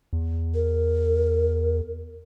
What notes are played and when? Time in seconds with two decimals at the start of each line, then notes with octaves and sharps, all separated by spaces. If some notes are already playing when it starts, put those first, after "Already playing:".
0.13 E2
0.55 A#4